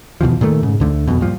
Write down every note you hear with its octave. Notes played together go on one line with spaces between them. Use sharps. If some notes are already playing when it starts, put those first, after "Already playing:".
D#2 B2 E3 F3
A#2 D#3 G3 A3
G#2 C#3
D2 D3 A3
D1 G1 F2 B2
G2 A#2 F3